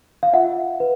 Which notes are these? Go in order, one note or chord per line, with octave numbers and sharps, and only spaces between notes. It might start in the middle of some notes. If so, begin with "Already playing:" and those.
F5
F4 E5 F#5
B4